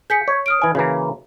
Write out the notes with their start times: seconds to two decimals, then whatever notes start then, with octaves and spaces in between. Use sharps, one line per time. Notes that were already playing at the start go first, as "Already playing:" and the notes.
0.10 G#4 G6 B6 C#7
0.28 C#5
0.46 D#6 F6 D7
0.62 E3 G#5
0.75 C#3 E3 A#3 F#4